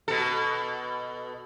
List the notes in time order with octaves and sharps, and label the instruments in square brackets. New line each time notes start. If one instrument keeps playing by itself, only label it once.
[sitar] B2 A4